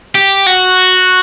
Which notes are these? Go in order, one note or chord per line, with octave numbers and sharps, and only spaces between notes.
G4
F#4